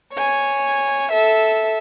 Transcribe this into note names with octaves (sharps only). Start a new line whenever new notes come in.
C#5 G#5
A4 E5